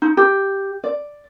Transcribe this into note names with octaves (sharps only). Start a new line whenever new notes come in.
D#4
G4
D5